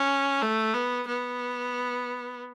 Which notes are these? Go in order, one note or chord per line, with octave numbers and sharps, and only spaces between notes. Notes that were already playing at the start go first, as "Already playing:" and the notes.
Already playing: C#4
A3
B3
B3